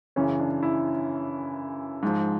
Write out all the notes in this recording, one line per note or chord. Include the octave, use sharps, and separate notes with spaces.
F#2 C#3 E3 C#4
D4
E4
G#2 F3